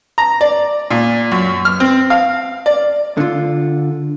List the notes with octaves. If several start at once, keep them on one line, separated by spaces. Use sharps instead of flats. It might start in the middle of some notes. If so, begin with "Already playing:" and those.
A#5
D5
A#2
F#2
F6
C4
F5
D5
D3 F4